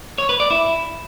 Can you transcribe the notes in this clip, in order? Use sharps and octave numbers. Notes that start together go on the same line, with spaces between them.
C#5
B4
D5
E4